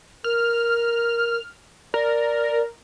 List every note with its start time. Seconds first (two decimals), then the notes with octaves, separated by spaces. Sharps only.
0.24 A#4 F6
1.94 A#4 D5